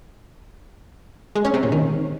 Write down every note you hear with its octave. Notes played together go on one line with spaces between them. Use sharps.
G#3
C#4
C3
A#2
D#3